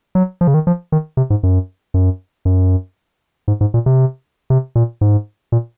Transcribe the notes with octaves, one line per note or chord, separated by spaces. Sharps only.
F#3
F3
C#3
D#3
F3
D#3
C3
G#2
F#2
F#2
F#2
G#2
G#2
A#2
C3
C3
A#2
G#2
A#2